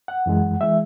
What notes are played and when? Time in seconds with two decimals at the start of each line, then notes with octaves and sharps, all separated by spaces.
0.08 F#5
0.26 F#2 E3 G#3
0.61 E3 G#3 E5